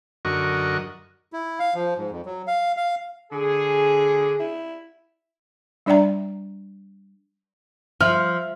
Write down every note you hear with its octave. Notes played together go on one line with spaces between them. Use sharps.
F#2 D3 F#4 A#4 D#5 C#6
E4
F5
F3
G#2
F2
F#3
F5
F5
D3 G#4
E4
G3 D4 D5 E5 G5 A#5
F3 E5 F6